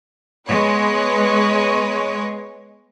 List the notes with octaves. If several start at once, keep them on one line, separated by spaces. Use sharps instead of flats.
G#3 B3 B4 C#5